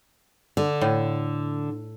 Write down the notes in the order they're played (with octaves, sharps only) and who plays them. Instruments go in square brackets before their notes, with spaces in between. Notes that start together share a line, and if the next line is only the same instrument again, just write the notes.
[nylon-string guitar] D3
[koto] A2